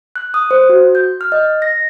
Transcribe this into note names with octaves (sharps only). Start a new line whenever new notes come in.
F#6
D#6
C5
F#4
G6
F6
D#5
A#6